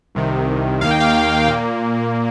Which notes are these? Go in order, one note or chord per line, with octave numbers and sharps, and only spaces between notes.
C2 C3 D#3
D#2 D#3 A#3 F5
G5
F5
A#2 A#3